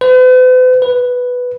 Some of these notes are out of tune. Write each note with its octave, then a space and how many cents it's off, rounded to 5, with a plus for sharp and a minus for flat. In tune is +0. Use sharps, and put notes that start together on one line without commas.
B4 +45
B4 +0